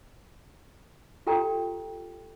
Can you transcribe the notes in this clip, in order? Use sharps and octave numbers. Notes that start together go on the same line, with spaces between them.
F4 G4 A4 G5 A#5